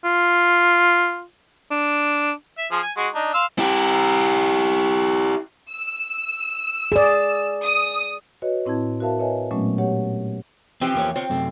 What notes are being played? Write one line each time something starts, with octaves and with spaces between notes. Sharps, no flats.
F4
D4
E5
F3 G#4
G#5
G#3 F#4
D4 D#4
F5 C6 E6
E4 G4
E6
G#4 D5
D#6
F#4 B4 C#5 D#5
A2 C4 E4 A5 G#6
F#4 A#4 C5 E5 F5 A5
B4 C#5 D#5 E5 G#5
A#2 F#3 G#3 A3 B3 C#4
G4 C#5 F#5
E3 F3 C4 G4
E2 A#3 C#5
C4 F4 C#5
F#2 C3 A3